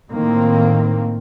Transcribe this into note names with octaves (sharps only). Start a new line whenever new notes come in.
A2 D#3 A#3 C4